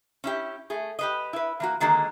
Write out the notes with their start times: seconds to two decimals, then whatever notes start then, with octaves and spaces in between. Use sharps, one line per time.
0.24 C#4 E4 G4
0.70 A3 G#4
0.99 G4 B4 D#5
1.33 E4 B4
1.60 E3 A#3 F#4
1.80 D3 D#3 G#3 A#3 F#4